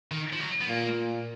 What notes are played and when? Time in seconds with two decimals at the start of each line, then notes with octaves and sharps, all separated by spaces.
0.11 D#3
0.32 F3
0.40 F#3
0.61 B3
0.69 A#2 A#3